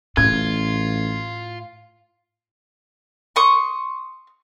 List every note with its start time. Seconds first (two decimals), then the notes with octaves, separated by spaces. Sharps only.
0.17 A1 A2 F4 G#6
3.36 C6 C#6 D#6